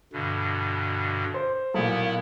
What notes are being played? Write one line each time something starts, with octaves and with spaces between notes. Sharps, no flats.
G2 B2 D3
C5
B1 A#2 B3 E4